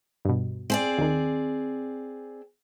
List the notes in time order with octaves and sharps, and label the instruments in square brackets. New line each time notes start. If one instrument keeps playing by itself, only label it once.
[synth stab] G2 B2
[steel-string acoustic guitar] C4 G#4 D5
[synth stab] D#2 D#3